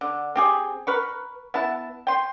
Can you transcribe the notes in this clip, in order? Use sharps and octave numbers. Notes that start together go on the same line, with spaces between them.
D3
C4 G4 G#4
A#4 B4 C#6
B3 E4 A5
G5 C6